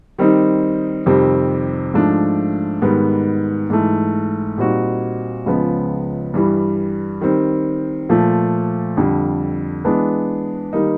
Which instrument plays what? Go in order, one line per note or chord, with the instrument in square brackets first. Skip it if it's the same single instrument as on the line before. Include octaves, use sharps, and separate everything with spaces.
[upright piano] D#3 G3 C4 D#4
F2 C3 D#3 G3 C4
G#2 F3 A3 D4
G#2 D#3 G3 B3
G#2 E3 A3
A#2 G3 C4 D#4 F#4
C#2 C#3 F3 G#3 B3
G2 E3 G3
D#3 G3 C4
A#2 F3 A3
F2 D3 G3
E3 G#3 B3 D4
D#3 G3 A#3 D#4